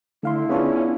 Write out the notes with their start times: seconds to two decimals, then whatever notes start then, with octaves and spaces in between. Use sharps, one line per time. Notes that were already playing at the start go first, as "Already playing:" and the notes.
0.23 D3 A3 E4 F5 C6
0.49 B3 C#4 D4 F4 G#4 C#5 F5